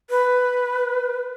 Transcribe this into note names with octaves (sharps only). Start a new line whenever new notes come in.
B4